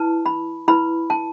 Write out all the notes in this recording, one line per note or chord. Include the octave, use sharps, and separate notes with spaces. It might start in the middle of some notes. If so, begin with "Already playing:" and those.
Already playing: E4 B4 A5
B5
E4 B4 B5
A5